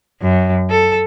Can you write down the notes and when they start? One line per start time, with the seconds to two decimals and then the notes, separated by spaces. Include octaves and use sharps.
0.22 F#2
0.70 A4